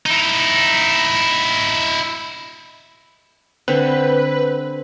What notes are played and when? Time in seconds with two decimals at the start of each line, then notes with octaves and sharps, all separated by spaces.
0.06 D#4 E4
3.68 D3 C4 B4